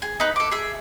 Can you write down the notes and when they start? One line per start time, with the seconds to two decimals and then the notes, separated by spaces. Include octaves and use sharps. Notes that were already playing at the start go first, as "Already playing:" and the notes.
0.02 G#4
0.20 D#4 B4
0.36 A4 D6
0.51 G#4 E5